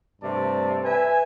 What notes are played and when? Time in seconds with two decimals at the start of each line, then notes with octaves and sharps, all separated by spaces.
0.22 G2 C3 A3 D5 A5
0.84 B4 E5 G#5